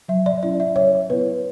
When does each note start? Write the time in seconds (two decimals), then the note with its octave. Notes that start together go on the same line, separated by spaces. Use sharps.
0.08 F#3 E5
0.26 D5
0.43 C#4 E4 D5
0.60 E5
0.76 F#3 C#5
1.10 B3 E4 B4